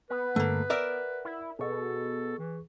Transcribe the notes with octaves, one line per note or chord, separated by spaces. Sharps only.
B3 B4
G2 D3 G3 A3 A#3
A#4 D5 E5 F#5
E4
B2 G#4 A4 C#6
E3